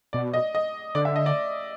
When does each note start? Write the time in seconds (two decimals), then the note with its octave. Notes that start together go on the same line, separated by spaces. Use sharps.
0.13 B2 D5
0.34 D#5
0.55 D#5
0.95 D3 D5
1.05 E5
1.16 D#5
1.26 D5